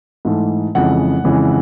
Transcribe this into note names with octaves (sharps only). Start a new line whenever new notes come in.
G#2 E3 A3
F2 C#3 E3 G#3 F#5
F2 C#3 E3 G#3